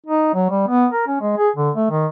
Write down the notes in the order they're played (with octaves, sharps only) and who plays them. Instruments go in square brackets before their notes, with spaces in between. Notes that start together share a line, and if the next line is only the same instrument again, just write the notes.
[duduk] D#4
F#3
G3
B3
A#4
C#4
G#3
G#4
D3
A3
D#3